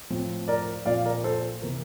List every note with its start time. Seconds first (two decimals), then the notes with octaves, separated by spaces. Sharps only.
0.10 A2 F3 C4
0.48 A#4 D5
0.86 A#2 F3 C4 F4 D5 F5
1.05 A#4 D5
1.24 A4 C5
1.62 C3 E3 A#3 A#4